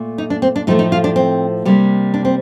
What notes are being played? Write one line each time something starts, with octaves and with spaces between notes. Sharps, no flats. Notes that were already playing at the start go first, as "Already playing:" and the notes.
Already playing: A#2 A3
D#4
D4
C4
D4
A2 F3 A3 D#4
D#4
F4
D4
C4
C3 G3 A#3
D4
C4